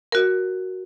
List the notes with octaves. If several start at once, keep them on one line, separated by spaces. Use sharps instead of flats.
F#4 A#4